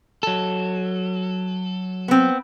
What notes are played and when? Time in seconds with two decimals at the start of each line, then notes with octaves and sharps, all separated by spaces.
0.23 F#3 A4
2.08 B3 C4